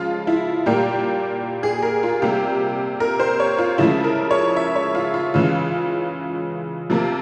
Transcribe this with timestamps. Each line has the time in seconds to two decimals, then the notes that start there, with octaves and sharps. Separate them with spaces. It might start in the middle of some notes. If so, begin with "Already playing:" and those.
Already playing: C#3 F3 G#3 F4
0.27 E4
0.66 A#2 G3 A#3 G4
1.63 G#4
1.83 A#4
2.03 F4
2.22 C3 G3 A#3 G4
3.00 A#4
3.19 C5
3.40 C#5
3.59 F4
3.78 C#3 F3 G#3 E4
4.04 A#4
4.31 C#5
4.56 E5
4.76 C#5
4.95 F4
5.14 F4
5.34 C#3 E3 G#3 F4
6.90 C3 F3 A#3